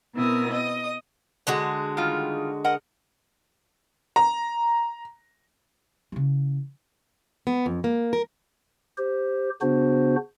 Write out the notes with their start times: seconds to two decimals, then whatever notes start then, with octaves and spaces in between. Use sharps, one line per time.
0.14 B2 B3 C4 E4 A#4 D#6
0.52 D#5 D#6
1.47 D3 G#3 F#4
1.97 D#3 G3 F4
2.64 A#4 D#5 F#5
4.16 A#5
6.12 C#3 E3
7.47 B3
7.66 F2
7.84 A#3
8.13 A#4
8.98 G4 C5
9.61 C#3 B3 D4 F#4 C5